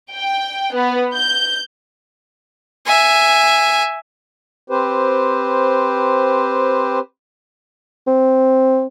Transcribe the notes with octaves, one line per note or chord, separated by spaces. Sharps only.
G5
B3
G6
E5 G#5
C4 G4 B4 C5
C4